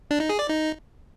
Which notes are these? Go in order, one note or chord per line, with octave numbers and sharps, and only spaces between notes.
D4
D#4
G#4
D5
D#4